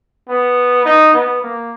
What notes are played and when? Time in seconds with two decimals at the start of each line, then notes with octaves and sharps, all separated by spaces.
0.29 B3
0.86 D#4
1.14 B3
1.42 A#3